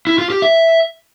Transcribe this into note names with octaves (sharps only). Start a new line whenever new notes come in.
E4
F4
G4
E5